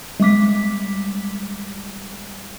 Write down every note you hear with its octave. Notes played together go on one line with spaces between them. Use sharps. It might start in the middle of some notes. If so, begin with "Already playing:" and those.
G3 G#3 D6 B6